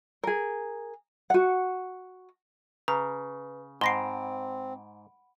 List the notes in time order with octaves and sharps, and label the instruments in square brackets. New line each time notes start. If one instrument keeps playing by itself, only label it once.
[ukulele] G#4 A#4
F#4 F#5
[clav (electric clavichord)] C#3 [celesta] B4 [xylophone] A#5
[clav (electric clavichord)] G#2 [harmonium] C4 [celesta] F#5 B5 D7 [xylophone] C6 A#6 C7